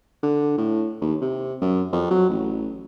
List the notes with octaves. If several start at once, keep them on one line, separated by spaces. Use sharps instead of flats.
D3
A2
D#2
C3
F#2
F2
F#3
A1